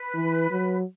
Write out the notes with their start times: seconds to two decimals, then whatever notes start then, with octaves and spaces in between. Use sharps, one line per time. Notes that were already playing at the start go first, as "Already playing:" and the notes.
Already playing: B4
0.14 E3
0.51 F#3